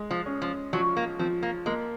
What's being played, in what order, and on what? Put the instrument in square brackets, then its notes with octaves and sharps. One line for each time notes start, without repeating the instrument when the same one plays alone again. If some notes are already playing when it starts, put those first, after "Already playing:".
Already playing: [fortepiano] G#3
[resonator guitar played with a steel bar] F3
[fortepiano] C#4
[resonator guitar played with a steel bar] F3
[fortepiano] F3 [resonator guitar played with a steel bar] F#3
[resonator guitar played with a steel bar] A#3
[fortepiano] F3 [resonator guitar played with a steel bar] C4
[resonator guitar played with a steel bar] A#3
[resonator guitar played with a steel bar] G#3 [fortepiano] A#3